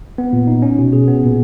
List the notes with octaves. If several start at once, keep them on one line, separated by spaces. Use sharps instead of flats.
B3
A#2
D#4
C#4
B2
G#4
B3
A#2